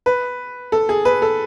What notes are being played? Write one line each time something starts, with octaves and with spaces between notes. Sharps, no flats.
B4
A4
G#4
B4
A4